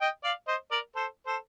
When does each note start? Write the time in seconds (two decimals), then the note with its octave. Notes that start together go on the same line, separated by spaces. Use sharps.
0.01 D#5 G5
0.24 D5 F5
0.48 C5 D#5
0.71 A#4 D5
0.96 A4 C5
1.26 A4 C5